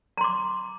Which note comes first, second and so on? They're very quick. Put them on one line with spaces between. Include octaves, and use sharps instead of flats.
A#5 C6 D6